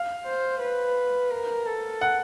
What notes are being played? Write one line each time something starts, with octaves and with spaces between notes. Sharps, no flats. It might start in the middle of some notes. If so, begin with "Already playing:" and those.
Already playing: F5
C5
B4
A#4
A4
F#5